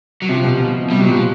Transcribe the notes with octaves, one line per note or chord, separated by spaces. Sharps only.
F#3
C3 F3
B2
B2
C3 G3
A#2 F#3
B2 F3